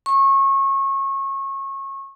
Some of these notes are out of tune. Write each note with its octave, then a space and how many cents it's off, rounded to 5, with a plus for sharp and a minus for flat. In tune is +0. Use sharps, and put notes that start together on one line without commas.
C#6 -25